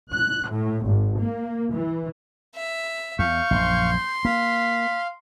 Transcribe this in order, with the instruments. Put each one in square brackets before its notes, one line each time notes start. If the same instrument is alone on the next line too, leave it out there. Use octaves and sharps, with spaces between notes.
[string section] F#6
A2
G#1
A#3
E3
[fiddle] E5
[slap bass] E2 [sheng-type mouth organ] F5 C#6 [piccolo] G6
[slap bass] A#1 F#2 [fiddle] C6
[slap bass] A#3 [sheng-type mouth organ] F5 [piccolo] B6